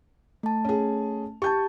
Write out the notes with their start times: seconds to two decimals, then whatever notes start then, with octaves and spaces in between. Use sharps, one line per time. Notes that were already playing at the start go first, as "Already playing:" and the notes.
0.43 A3 A5
0.65 C#4 G#4
1.42 G4 A5 C#6 G6